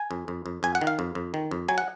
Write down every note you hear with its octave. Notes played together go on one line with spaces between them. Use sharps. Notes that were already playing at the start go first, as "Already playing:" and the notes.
Already playing: G#5
F2
F2
F2
F2 G#5
F#5
D#3
F5
F2
F2
D#3
F2
F#3 G#5
F#5